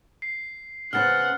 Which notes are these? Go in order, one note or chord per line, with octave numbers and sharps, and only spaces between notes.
C7
C#3 B3 C5 F#5 F6 A6